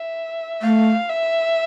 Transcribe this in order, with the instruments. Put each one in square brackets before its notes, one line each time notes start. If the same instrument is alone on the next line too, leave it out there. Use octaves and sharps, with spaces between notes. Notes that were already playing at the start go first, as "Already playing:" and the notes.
Already playing: [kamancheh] E5
[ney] A3 [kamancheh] F5
[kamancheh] E5